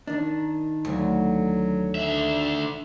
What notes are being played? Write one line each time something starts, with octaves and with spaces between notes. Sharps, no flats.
D#3 D4
D2 F#3
D3 E5